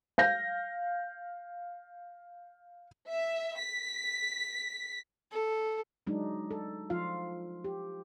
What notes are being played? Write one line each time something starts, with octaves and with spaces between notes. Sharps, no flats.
F5 G6 A#6
E5
B6
A4
F#3 G#3 D4 D#4
A4
F3 F4 F5
G4